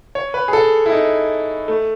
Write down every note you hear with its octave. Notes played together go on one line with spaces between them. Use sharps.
C#5
B4
G#4
A4
E4
D#4
A3